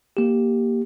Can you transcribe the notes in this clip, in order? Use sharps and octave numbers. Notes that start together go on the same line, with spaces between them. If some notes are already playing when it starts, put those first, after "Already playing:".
A#3 G4